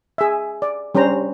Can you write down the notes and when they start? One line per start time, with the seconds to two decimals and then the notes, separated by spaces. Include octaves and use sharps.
0.18 G#4 E5
0.62 D5
0.95 G3 C#4 D4 C5 A#5